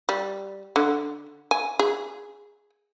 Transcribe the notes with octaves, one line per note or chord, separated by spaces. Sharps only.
G3
D3
G#5
G#4